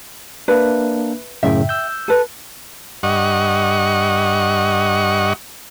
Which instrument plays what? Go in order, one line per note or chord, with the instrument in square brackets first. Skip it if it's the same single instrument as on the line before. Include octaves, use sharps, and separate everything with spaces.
[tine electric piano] A#3 D4 [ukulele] B4 E5
[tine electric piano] F#2 A2 C#3 [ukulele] E5 G5
[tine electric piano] E6 G6
[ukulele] A4 B4
[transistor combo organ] G2 D#5 F#5 C#6